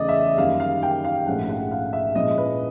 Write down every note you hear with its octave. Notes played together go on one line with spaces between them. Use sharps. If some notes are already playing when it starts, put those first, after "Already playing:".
Already playing: E2 C#3 E3 A3 D5 D#5
E5
F#2 D#3 G3 A#3 F5
F5
G5
F5
A#1 G#2 F3 A3 C#4 F#5
F#5
F5
E5
A#2 F3 G#3 C#4 E4 D#5
B4